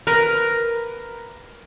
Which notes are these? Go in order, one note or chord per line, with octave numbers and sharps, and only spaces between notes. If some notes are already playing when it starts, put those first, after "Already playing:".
A#4 B4 A#5